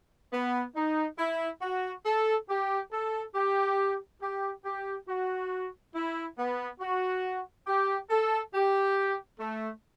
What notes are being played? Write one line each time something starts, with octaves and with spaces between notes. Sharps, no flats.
B3
D#4
E4
F#4
A4
G4
A4
G4
G4
G4
F#4
E4
B3
F#4
G4
A4
G4
A3